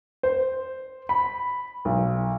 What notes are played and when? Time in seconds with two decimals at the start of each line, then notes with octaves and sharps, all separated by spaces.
0.23 C5
1.09 B5
1.85 B1